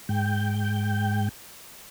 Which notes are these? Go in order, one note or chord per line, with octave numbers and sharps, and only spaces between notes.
G#2 G5